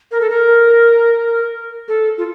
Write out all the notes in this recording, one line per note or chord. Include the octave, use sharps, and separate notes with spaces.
A#4
A4
A#4
A4
F4